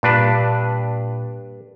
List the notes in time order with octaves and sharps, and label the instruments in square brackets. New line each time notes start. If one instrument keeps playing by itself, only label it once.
[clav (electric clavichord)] G2 D4 B4 [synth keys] A#2